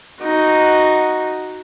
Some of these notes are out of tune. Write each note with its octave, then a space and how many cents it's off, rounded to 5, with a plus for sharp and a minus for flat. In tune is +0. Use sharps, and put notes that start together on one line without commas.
D#4 +0 F#4 +0